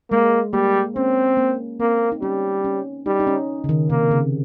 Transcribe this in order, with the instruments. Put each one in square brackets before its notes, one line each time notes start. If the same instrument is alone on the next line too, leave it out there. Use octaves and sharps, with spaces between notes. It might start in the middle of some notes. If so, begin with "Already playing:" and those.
[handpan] G#3 [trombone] A#3
[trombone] G3 [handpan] A#3
[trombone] C4 [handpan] C#4
[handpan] A#3
[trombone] A#3 [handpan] C4
[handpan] D#4
[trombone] G3 [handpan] C#4
[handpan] C#4
[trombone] G3 [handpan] D#4
[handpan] D#4
C#4
C#3
D#3
[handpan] C3 [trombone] A#3
[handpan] C#3